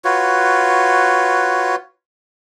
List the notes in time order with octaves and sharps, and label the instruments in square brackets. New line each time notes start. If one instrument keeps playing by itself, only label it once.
[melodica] F4 F#4 B4 C#5